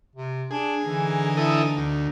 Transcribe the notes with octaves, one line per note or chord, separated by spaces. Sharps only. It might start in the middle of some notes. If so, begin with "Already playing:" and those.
C3
D4 G#4
D3 E3 D#4
E4 A4 D#6
D2